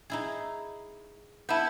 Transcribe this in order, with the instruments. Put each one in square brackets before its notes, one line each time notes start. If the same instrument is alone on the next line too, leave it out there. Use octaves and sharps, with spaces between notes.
[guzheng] D#4 E4 G#4
[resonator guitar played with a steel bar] B3 E4 [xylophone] E5 A5 G6